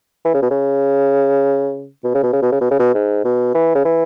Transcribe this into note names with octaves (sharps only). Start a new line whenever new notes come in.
E3
C#3
B2
C#3
B2
C#3
B2
C#3
B2
C#3
B2
C#3
B2
G#2
B2
E3
C#3
E3